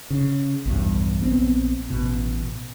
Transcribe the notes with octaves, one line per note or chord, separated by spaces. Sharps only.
C#3
B1 E2 G2
A#1 B3 C4
A1 B2